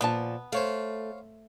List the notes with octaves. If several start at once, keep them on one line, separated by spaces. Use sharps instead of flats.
A#2 F3 B3 A5
A3 C5 C#5 F5